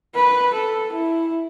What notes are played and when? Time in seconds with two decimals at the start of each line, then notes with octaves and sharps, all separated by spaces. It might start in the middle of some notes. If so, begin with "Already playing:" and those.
0.15 B4
0.54 A4
0.92 E4